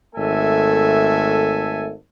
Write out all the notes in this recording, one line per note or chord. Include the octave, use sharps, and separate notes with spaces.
G#1 A3 A4 E5 G#5